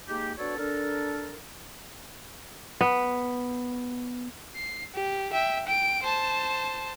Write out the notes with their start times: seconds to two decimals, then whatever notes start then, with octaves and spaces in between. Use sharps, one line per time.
0.07 G#3 A#3 D#4 G4
0.38 B3 D4 F#4 A4 C#5 D5
0.57 D4 A4 A#4
2.81 B3
4.55 C7
4.94 G4
5.33 E5 G5
5.67 G5 D7
6.03 C5 A5